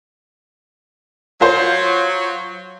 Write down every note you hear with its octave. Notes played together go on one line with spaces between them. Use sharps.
F#3 F4 C5